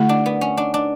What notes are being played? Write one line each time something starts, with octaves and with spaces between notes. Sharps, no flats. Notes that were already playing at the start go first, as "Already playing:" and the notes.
Already playing: D3 A3 E4 F#4
D4
B3
C#4
D4
D4